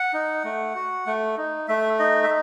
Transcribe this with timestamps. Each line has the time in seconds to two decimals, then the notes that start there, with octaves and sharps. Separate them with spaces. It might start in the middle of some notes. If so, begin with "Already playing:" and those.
Already playing: F#5
0.14 D#4
0.44 A3
0.75 F#4
1.06 A3
1.37 D#4
1.68 A3 E5
1.99 D#4 D#5
2.23 E5